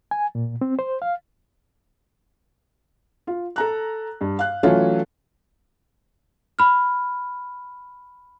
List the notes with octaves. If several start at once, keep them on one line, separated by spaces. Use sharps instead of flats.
G#5
A#2
C4
C5
F5
F4
A4 A#5 F#6
G2
F5 F#6
E3 F#3 A3 C#4 F4
B5 F6